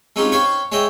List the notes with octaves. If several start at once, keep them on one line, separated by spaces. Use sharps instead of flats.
G#3 C4 C#4 D#4 F4 G4
C5 C#5 F5 G5 B5 C#6
G#3 C#5 D#5 E5 G5